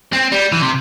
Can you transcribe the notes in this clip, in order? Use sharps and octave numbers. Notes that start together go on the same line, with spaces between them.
C4
G3
E3
C3